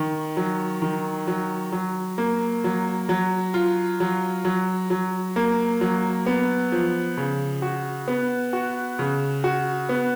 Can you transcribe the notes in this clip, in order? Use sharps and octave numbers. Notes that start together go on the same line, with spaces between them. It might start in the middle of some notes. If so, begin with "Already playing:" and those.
Already playing: D#3
F#3
D#3
F#3
F#3
A#3
F#3
F#3
F4
F#3
F#3
F#3
A#3
F#3
B3
F3
C#3
F#4
B3
F#4
C#3
F#4
B3